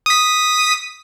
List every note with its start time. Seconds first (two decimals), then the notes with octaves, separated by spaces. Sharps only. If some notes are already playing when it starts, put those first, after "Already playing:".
0.06 D#6 B6